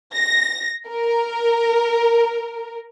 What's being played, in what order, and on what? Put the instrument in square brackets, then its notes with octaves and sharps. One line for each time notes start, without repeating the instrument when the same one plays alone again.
[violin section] A#6
A#4